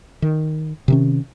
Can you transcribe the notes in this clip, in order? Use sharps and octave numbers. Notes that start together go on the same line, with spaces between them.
D#3
C3 D#3 C#4